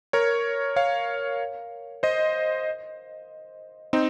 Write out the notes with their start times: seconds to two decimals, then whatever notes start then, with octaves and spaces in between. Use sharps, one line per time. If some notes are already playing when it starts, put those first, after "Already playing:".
0.13 A#4 C#5
0.76 C#5 F5
2.03 C5 D#5
3.93 C4 D#4